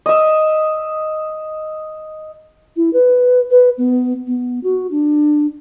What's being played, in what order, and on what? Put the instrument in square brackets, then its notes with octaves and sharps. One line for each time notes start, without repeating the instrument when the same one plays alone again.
[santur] D#5 E5
[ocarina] E4
B4
B4
B3
B3
F#4
D4